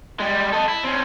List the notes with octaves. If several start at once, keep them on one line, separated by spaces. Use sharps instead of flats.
G3 G#3
A4 D#5
E4
C4 C#4